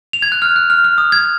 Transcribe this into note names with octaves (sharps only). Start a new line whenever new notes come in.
F7
G#6
F#6
F6
F#6
F6
F6
D#6
G#6